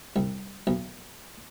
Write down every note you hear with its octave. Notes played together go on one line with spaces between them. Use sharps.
C2
B1